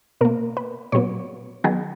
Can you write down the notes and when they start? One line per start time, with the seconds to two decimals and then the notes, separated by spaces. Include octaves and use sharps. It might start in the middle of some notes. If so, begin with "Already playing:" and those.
0.21 B2 A#3 A#4
0.57 B4
0.92 A#2 F#3 B3 C#5
1.64 D#3 F#3 B3 G#4